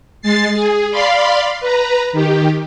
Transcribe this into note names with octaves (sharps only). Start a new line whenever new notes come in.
G#3 A6 C7
G#4
D5 F5 B5 C6
B4 A#5
D#3 G4